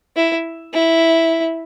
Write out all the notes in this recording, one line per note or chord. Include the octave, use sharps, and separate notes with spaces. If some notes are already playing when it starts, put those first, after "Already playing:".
E4
E4